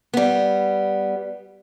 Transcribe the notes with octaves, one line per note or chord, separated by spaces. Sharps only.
G3 B3